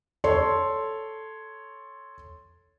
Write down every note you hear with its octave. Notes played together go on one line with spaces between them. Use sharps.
A4 C#5 C6